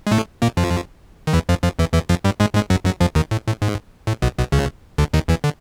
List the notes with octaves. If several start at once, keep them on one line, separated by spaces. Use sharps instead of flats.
G#3
A2 A3
A#2 A#3
F2 F3
D#3
E2 E3
F2 F3
F2 F3
E2 E3
E2 E3
F2 F3
G2 G3
G#2 G#3
G#2 G#3
F#2 F#3
F#2 F#3
F2 F3
D#2 D#3
A2
A2
G#2
A2
B1 B2
B1 B2
C#2 C#3
D2 D3
D#2 D#3
E2 E3
D3